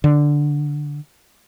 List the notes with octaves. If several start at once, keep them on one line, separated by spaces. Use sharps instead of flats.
D3